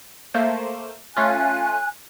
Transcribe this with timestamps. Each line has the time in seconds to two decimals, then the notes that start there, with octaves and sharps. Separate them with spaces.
0.34 A3 A#3 C5
1.17 A3 C#4 F4 G#5 F#6